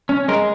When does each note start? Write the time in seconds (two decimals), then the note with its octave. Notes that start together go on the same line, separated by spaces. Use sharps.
0.09 C#4
0.28 G#3 A#4